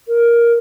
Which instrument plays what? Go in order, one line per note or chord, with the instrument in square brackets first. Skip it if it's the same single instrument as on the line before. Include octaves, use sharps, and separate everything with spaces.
[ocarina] A#4